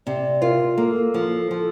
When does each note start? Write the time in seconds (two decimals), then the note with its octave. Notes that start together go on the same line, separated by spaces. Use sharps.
0.07 C3 D5
0.42 F4 A#4
0.78 A#3 A4
1.14 F3
1.51 F3